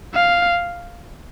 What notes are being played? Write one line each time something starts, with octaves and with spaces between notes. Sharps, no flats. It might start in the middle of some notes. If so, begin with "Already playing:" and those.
F5